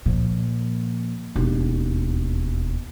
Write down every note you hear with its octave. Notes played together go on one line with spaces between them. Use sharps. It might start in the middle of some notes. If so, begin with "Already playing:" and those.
A#2 F3
E1 D#2